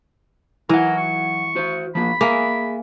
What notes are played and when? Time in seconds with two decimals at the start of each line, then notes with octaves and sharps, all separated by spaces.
0.69 E3 F#3 A#4 F#5
0.97 C#6
1.56 F#4 C5
1.95 F3 A#3 B5
2.21 A#3 G#4 E5 G#5